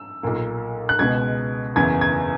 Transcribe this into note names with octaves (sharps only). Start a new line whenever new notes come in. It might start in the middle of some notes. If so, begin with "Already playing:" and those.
Already playing: E6
B1 A#2 A#3
F#6
C#2 B2 G#3 B3 G#6
F#1 E2 C#3 E3 B3 G#6
G#6